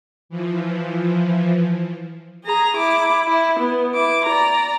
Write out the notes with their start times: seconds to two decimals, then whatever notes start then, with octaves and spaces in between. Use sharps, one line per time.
0.29 E3 F3
2.45 G#4 A#5
2.76 E4 D6
3.28 E4
3.59 B3
3.94 E4 D6
4.26 D5 A#5